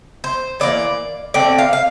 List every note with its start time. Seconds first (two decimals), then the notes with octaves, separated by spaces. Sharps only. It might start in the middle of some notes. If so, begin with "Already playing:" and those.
0.24 C5
0.60 E3 A#3 D5
1.34 D3 A3 C4 D5
1.59 F5
1.73 F5